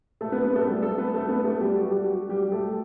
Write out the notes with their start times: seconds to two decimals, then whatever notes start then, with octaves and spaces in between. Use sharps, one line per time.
0.21 A3 A4
0.32 B3 B4
0.44 B3 B4
0.55 A3 A4
0.67 G3 G4
0.83 A3 A4
0.98 B3 B4
1.13 A3 A4
1.29 B3 B4
1.44 A3 A4
1.60 G3 G4
1.76 F#4
1.91 G3 G4
2.06 F#4
2.29 G3 G4
2.52 A3 A4